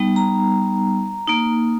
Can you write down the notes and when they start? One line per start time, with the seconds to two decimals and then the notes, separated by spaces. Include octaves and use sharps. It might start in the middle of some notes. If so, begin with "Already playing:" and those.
Already playing: G3 B3 D#4
0.16 A#5
1.27 A#3 D#4